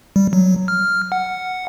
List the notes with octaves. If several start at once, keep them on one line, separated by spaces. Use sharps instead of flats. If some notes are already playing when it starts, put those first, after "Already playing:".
G3
F#3
F6
F#5